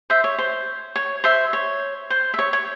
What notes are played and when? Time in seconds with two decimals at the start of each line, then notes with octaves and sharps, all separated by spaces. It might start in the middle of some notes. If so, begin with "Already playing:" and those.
0.10 C5 E5
0.24 C#5
0.38 C5
0.96 C#5
1.24 C5 E5
1.53 C#5
2.10 C5
2.34 E5
2.39 C#5
2.53 C#5